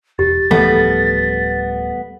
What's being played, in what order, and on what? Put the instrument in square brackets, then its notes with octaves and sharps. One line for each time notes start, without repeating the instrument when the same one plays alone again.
[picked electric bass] E1 [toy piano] G4 [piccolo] A6
[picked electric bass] D1 E3 F3 [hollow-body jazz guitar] G3 A3 B3 [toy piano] A4